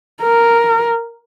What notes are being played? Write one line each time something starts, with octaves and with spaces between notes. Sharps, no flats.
A#4